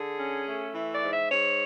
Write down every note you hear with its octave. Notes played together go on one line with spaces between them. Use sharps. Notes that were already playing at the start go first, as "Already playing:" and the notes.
Already playing: D3 G#4
C#4
A3
E3
D5
G#2
E5
G#2 C#5